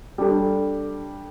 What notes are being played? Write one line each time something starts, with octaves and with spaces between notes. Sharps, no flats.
G3 D4 A4